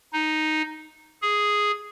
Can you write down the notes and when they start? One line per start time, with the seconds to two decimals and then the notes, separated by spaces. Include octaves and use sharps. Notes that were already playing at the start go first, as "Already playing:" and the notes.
0.13 D#4
1.22 G#4